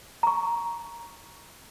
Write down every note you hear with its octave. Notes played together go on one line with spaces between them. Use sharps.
A#5 C#6